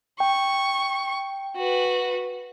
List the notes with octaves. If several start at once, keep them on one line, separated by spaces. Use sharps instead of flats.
G5 C#6
F#4 B4